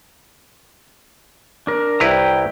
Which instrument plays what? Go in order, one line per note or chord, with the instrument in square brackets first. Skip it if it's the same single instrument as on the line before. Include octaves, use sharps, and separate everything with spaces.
[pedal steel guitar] D4 A#4
[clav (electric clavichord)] C2 E4 B4 [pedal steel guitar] G5 A#5